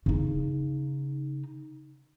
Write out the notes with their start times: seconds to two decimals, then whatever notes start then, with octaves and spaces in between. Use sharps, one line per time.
0.06 C#3 D#4